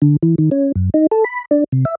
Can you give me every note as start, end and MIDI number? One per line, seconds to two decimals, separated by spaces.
0.02 0.16 50
0.23 0.35 52
0.38 0.50 51
0.51 0.72 61
0.76 0.90 42
0.94 1.07 63
1.11 1.24 69
1.24 1.45 83
1.51 1.64 62
1.72 1.85 48
1.85 1.95 76